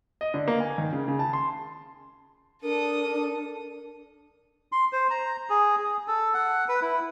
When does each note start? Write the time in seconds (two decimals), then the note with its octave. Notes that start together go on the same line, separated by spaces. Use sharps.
0.21 D#5
0.34 D3
0.48 A#3
0.60 G#5
0.78 D#3
0.93 C#3
1.08 C#3
1.19 A5
1.33 C6
2.63 D4 A4 A#4 D#6
4.72 C6
4.93 C5
5.10 A#5
5.50 G#4
5.79 G#4
6.08 A4
6.34 F#5
6.69 B4
6.82 E4